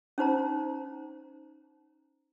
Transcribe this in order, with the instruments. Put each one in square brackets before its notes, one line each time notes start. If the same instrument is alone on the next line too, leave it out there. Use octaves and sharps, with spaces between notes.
[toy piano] C#4 D#4 C5 A#5